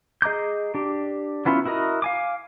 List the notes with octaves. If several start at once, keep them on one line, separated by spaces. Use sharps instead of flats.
G#4 D#5 A#5 D6 G6
D4 G4
F#3 B3 C#4 E4 F4
E4 F#4 A#4 D#5
F5 G#5 D6